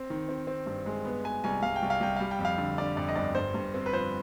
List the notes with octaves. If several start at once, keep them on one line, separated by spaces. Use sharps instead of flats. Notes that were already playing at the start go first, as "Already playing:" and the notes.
Already playing: C4
D#3
C4
C4
G2
G#3
B3
B3 G#5
C2 G#5
C2 F5
G5
C2
F5
C2 G5
G3 F5
G5
F2
F5
D3
D3 D5
F2 D5
D#5
G1 D5
G2 C5
G2
C4
B4
F3 C5